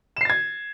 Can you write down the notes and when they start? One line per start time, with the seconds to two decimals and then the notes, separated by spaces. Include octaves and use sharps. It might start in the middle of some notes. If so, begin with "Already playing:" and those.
0.17 E7
0.21 C7
0.25 A6
0.30 G#6